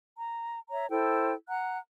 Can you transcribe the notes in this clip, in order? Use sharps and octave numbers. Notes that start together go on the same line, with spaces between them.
A#5
C#5 E5 A#5
E4 A4 C5 G5
F#5 A#5 F#6